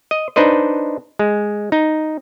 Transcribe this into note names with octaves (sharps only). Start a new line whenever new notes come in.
D#5
D4 D#4 B4 C5 D#5
G#3
D#4